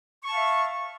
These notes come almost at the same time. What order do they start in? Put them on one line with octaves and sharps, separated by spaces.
C#6 A5 F5 E5